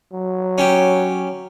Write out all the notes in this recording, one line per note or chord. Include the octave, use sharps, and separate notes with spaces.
F#3
C#4 G4